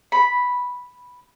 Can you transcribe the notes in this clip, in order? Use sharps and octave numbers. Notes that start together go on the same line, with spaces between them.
B5